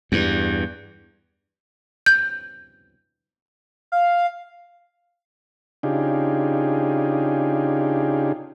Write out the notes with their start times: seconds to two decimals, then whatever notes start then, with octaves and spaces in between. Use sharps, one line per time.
0.12 E2 G2
2.06 G6
3.92 F5
5.83 C#3 D4 D#4 F4 G4 G#4